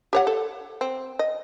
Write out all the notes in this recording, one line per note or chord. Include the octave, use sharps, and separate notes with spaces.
G4 C#5 F#5
A4
C4
D#5